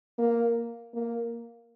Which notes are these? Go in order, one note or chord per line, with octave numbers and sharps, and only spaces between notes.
A#3
A#3